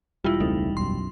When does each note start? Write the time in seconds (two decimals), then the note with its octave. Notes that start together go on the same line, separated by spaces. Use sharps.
0.24 E1 G3 E4 F4
0.40 C#2 A3 C4 D#4
0.77 B1 F#2 C6